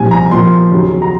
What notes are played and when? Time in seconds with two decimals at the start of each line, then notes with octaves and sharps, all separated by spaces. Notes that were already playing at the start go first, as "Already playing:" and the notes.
Already playing: C2 A#2 F3 G#5
0.11 A#5
0.31 A#2 F3 A#3 C6
0.71 D#2 C#3 F#3
1.02 A#5